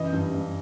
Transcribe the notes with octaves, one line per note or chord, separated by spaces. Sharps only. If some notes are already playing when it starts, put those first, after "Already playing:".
Already playing: F#2 E3 D#5
G2
G2